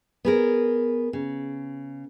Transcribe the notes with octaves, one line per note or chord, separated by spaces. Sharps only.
B3 G#4 A#4
C#3